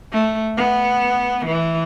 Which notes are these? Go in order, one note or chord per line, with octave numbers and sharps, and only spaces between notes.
A3
B3
E3